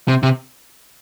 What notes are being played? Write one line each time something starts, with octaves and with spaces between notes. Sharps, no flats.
C3
C3